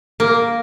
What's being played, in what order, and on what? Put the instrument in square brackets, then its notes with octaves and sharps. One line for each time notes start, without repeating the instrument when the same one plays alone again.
[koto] A#3